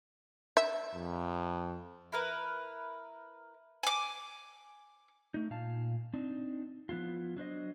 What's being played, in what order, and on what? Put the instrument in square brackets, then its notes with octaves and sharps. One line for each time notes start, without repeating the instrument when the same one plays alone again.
[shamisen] E5
[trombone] F2
[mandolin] E4 A#4 B4
G#5 D6
[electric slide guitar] A3 D#4
A#2 F5 A5
C4 D4 D#4
F3 B3 E4 F4
F#3 D4 C5 D#5